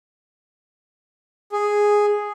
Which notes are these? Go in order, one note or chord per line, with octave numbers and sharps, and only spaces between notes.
G#4